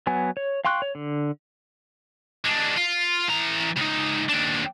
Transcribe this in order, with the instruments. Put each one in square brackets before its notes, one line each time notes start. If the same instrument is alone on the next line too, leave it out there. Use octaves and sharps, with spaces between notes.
[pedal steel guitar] F#3 B3 G#5
C#5
F5 G5 C6 C#6 F#6
C#5
D3
[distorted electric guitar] G#3 D4
F4
E3 A#5
C#2 D#4
D#2 D4